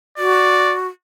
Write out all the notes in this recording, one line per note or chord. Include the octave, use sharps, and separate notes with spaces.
F#4 D5